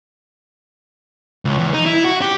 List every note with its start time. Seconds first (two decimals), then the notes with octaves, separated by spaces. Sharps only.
1.45 C#2
1.59 E2
1.74 D#4
1.86 E4
2.05 F#4
2.21 G4